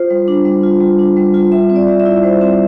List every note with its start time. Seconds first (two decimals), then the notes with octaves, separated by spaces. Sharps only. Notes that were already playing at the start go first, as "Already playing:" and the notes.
Already playing: F4 C5
0.10 G3
0.28 D4
0.45 G3
0.63 F4
0.80 G3
0.99 D4
1.17 G3
1.34 F4
1.52 G3 E5
1.70 C4
1.76 D5
1.88 G3
2.00 E5
2.06 E4
2.23 G3 C5
2.41 C4